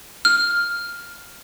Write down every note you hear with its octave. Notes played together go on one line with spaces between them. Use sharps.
F6